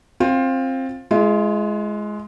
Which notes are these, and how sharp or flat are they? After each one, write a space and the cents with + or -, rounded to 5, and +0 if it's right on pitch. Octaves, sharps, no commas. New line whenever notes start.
C4 +20 F4 +15
G#3 +15 F4 -45